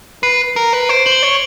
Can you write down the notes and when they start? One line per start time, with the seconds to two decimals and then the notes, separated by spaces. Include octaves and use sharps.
0.23 B4 C7
0.56 A#4
0.73 B4
0.89 C5 D7
1.06 C5 F#7
1.12 G7
1.23 C#5